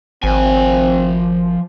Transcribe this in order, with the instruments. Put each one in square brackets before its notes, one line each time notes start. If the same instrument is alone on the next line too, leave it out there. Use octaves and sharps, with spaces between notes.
[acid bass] G#1 [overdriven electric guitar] F3 G#5 [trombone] C4